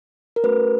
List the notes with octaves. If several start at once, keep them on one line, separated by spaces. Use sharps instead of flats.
A#4
A3 C#4 F#4 A4 B4